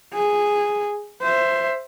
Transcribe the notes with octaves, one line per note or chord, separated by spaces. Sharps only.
G#4
C5 E5